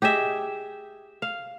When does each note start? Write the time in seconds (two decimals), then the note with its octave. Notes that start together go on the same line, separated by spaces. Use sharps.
0.02 G4 G#4 D#5 E5
1.22 F5